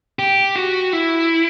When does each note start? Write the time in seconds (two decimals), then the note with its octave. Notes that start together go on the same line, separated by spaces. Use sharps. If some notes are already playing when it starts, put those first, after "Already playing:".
0.19 G4
0.56 F#4
0.93 E4